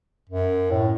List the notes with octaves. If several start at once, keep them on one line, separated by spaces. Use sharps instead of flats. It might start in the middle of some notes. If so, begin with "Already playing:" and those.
F#2
A2